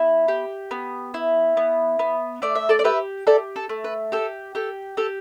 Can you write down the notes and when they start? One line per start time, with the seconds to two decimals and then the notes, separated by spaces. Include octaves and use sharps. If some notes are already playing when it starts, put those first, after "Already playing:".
Already playing: B3 E4
0.28 G4
0.71 B3
1.14 E4
1.57 B3
1.99 B3
2.42 A3 D5
2.55 E5
2.69 A4 D5
2.79 D5
2.84 G4 B4 E5
3.27 G4 A4 D5
3.56 A4
3.69 A3
3.84 B4
4.12 G4 A4
4.55 G4 A4
4.97 G4 A4